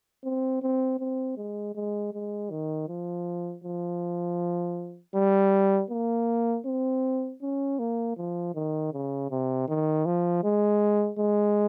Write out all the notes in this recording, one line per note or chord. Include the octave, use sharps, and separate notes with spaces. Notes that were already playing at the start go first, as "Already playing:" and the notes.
C4
C4
C4
G#3
G#3
G#3
D#3
F3
F3
G3
A#3
C4
C#4
A#3
F3
D#3
C#3
C3
D#3
F3
G#3
G#3